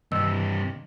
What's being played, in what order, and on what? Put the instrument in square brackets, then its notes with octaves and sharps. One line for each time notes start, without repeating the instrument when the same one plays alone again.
[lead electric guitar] G2 C3 [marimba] D#3 E6